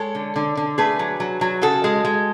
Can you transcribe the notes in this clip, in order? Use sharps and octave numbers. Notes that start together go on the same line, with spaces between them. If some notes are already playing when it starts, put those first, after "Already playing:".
Already playing: G#3 A4 C#5
D3
D3
D3
A3 G#4 B4
F#3
F#3
F#3
C#3 F#4 A4
G#3
G#3